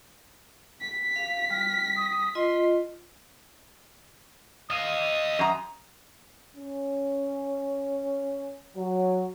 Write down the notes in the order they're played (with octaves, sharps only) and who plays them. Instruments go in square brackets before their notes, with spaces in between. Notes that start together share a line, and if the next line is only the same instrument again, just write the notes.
[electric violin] B6
[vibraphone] F5
[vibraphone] G3 [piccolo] F6
[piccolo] D#6
[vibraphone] F4 D#5 [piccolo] C6
[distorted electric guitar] D#5 F5 [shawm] D#6
[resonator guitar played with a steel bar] F#2 A#5
[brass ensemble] C#4
F#3